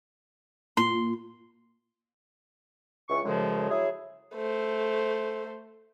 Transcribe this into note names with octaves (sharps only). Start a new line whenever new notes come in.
A#2 C6
C#2 E3 C#6
F#2 A2 C#3 F3 G#3
F#3 E4 G#4
A3 C5